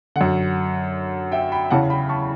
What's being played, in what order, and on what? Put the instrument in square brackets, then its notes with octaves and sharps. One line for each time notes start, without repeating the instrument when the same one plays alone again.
[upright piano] D3 F#5
F#2
E5 G5
G5 B5
E2 C#3 E3 F#5 A5
G5 B5
A5 C#6